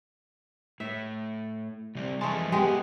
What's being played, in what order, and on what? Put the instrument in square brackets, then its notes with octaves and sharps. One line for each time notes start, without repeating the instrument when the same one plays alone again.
[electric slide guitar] A2 [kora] E5
[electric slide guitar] C3 G3 C4
[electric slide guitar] F2 E3 A5 [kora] G#3 A3
[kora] G#3 G4 [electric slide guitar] A3 B3 B4